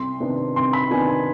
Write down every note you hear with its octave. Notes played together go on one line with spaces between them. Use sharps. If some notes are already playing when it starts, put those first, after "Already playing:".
Already playing: C2 C6
C3 D#3 B3 D4
C2 C6
B5
C3 D#3 B3 D4 G#5
G#5